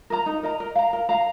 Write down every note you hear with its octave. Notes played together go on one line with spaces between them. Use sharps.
A#4 D#5 A#5
D#4
A#4 D#5 A#5
A#4
F5 A#5
A#4
F5 A#5